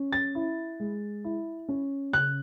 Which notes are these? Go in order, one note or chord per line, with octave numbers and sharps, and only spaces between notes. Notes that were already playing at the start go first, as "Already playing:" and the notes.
Already playing: C#4
A6
E4
G#3
E4
C#4
C#3 F#6